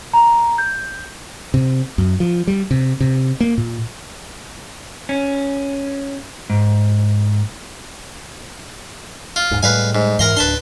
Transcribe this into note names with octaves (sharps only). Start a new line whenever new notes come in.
A#5
G6
C3
F#2
F3
G3
C3
C3
A#3
A#2
C#4
G#2
F4
D#1 G#2
A2 G3 G#3 B4 F5 G#5
G#2
F2 G#2 E3 A#4 A#5 C6
D1 D4 B4 A5 C6